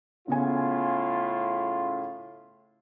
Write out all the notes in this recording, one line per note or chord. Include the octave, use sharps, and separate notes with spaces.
A2 C#3 B3 F4 G#5